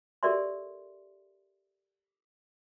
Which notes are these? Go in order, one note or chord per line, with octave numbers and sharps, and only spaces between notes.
G4 A4 A#4 D5 E5 C6